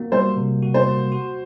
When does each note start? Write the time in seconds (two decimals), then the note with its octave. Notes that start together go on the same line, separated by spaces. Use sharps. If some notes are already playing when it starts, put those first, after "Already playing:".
Already playing: A#3 F#4
0.12 G3 C5
0.37 C3
0.63 F#4
0.74 C5
0.87 A#3
1.12 F#4